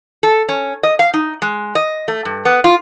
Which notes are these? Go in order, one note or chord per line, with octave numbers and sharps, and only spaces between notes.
A4
C#4
D#5
F5
D#4
G#3
D#5
A3
G2
B3
F4